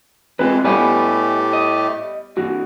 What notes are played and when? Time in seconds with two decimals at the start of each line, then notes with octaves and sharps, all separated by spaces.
0.39 E3 G#3 C4 F4 B4
0.65 A2 G3 A3 B3 G4 B4 D#5 G#5
1.53 D#5
2.37 G2 E3 F#4